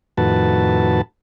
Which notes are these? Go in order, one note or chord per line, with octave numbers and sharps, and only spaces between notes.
F2 A2 D#3 F#4 B4 A5